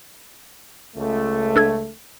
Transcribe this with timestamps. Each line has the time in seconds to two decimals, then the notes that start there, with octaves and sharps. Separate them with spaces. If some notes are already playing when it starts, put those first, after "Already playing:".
0.96 C#2 A3
1.56 D4 A4 G#6